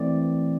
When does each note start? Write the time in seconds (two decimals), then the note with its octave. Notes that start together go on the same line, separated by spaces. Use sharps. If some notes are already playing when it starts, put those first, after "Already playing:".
Already playing: E3 A3 C4 D5